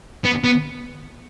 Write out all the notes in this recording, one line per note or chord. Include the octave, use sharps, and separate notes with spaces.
B3
B3